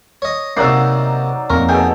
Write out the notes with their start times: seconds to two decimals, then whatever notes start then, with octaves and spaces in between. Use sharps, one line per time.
0.22 C#5 D#5
0.57 C3 F#3 A#3 D#4 D5 E6 F#6 C7
1.50 F2 A#3 A#4 C#6
1.69 B2 G#4 A4 G5